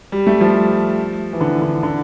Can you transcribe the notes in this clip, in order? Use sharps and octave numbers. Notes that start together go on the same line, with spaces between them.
G3
A3
F3
E3
D3
D3
D3